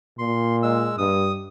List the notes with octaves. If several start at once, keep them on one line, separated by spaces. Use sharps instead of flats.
A#2 C6
G#3 E6
G2 D#6